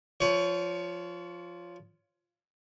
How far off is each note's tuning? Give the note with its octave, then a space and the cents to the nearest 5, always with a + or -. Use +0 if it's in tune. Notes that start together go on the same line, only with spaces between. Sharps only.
F3 +0 C#5 +25